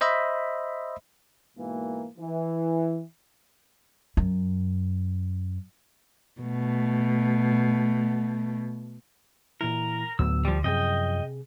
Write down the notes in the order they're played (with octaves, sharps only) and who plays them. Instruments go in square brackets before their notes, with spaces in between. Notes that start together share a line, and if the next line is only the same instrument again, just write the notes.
[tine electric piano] C5 D#5 E5 B5
[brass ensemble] G#2 B2 E3 A#3
E3
[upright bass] F#2
[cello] B2 A3
[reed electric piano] A#2 E3 E4 [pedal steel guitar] A#4
[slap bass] D2 [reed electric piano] A2 F#3 B3 [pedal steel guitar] E6
[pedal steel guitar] F3 G3
[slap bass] F#2 F3 [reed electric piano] C3 G#4 [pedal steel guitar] D#5 G5